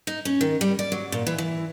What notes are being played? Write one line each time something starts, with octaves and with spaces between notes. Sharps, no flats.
D#4
C#4
D#3
G3
D5
F#3
A#2
E3
E3